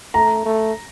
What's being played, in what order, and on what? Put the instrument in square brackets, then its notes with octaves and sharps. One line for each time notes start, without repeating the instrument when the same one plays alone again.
[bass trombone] A3 [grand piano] A#5
[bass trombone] A3